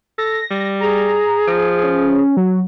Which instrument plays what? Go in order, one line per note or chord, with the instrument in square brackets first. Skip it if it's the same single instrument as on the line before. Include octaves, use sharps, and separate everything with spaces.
[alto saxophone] A4 [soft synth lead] A#6
[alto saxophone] G3
[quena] G#4 [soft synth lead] A#5
[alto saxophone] F3
[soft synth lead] C#4
F#3